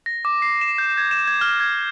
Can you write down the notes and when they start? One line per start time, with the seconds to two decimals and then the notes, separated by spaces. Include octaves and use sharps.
0.06 A#6
0.25 D6
0.42 C7
0.61 E7
0.78 G6
0.97 G#6
1.11 E7
1.27 G#6
1.41 F6
1.60 G#6